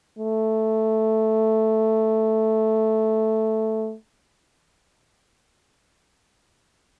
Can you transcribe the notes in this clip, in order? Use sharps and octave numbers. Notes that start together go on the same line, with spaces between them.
A3